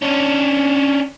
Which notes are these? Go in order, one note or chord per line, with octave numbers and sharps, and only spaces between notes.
C#4 D4